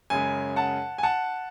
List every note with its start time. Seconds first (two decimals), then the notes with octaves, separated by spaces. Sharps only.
0.10 F#2 C#3 G#3 G#5
0.56 F#5 A5
0.98 G#5
1.03 F#5 A5